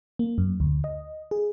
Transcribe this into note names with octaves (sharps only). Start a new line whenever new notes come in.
A#3
F#2
D2
D#5
G#4